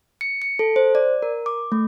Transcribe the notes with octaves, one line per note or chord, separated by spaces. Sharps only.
C#7
C#7
A4
C5
D5
A#4
D6
A3